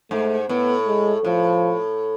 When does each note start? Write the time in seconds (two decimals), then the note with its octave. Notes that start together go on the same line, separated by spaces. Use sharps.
0.11 G#2 A3
0.49 A2 B3
0.87 G#3
1.25 A2 F3